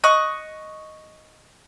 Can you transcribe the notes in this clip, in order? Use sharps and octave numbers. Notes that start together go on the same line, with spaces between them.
D#5 C#6 F#6